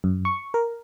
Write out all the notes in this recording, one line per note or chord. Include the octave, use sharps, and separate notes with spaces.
F#2
C#6
A#4